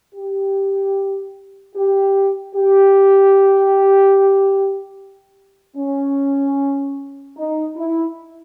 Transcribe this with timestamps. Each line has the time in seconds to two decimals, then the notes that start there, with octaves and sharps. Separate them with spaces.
0.14 G4
1.75 G4
2.55 G4
5.76 C#4
7.36 D#4
7.77 E4